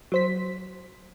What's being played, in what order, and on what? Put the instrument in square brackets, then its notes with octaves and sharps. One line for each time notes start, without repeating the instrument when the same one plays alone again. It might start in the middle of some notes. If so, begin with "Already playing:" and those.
[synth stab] F#3 C5 B6